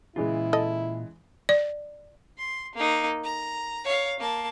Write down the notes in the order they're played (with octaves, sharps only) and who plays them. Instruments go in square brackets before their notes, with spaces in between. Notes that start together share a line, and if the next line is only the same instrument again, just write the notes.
[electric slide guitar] A#2 F4 [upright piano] C#3 E3 G#3 [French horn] E4
[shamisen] A4 D#5
[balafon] D5
[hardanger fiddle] C6
A#3 D#4
A#5
C#5 F5
A#3 A5